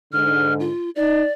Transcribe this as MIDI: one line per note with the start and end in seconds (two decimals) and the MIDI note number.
0.12 0.68 44
0.12 0.68 50
0.12 0.53 89
0.60 0.90 65
0.96 1.23 63
0.96 1.32 74